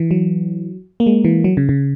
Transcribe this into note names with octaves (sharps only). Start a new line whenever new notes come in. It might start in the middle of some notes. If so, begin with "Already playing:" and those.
Already playing: E3
F#3
A#3
G#3
E3
F#3
C#3
C#3